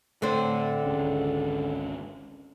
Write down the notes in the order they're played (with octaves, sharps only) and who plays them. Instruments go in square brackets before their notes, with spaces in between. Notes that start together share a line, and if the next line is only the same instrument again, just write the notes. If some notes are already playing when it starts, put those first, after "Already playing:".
[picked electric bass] A2 A3 [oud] D3 C4
[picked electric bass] G#1 C#2 C#3